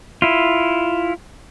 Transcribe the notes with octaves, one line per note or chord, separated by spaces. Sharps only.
E4 F4